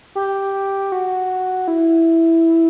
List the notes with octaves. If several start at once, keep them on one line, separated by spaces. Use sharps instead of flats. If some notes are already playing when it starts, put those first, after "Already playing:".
G4
F#4
E4